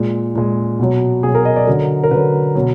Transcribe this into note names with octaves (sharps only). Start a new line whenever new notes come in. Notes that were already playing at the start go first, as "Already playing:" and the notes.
Already playing: A#2 G#3
A#2 G#3
B2 F#3
B2 F#3 G#4
A#4
D#5
D5
D3 F#3 A#4
A#4
D3 F#3 B4
B2 F#3